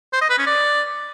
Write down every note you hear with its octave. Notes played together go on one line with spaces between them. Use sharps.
C5
D#5
B4
C#4
D5